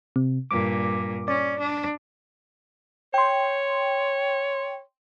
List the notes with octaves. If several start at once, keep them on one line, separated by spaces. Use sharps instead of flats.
C3
G2 A#2 D6
C#4 D5
D4
C#5 G5 C6